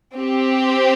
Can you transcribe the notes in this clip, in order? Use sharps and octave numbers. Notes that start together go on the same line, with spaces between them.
C4 G4